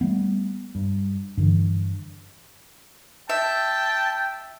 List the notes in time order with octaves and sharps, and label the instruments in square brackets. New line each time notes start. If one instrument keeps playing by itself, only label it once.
[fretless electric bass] G3 A3 B3
G2
G2 D3 E3
[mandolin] E5 [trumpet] G5 [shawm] A5